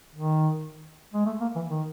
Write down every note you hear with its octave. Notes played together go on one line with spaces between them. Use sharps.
D#3
G#3
A3
A#3
E3
D#3